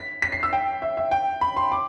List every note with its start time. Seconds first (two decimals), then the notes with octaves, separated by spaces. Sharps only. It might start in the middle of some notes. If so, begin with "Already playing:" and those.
Already playing: B6
0.22 B6
0.32 C7
0.43 E6
0.53 G5
0.82 E5
0.97 E5
1.11 G5
1.41 B5
1.56 C6
1.72 D6